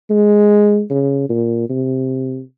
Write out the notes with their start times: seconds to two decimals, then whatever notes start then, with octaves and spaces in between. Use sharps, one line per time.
0.10 G#3
0.90 C#3
1.30 A#2
1.69 C3